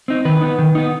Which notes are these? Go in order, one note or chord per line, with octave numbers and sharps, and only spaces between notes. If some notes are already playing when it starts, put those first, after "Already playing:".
C4 D#4
D#3 B4
B3 D#4
D#3
B3 D#4